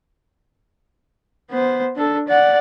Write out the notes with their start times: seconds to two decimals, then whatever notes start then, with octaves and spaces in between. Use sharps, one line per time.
1.50 B3 C5
1.96 D4 A4
2.28 D5 F#5